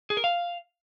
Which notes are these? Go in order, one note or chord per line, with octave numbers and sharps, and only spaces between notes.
G#4
A#4
F5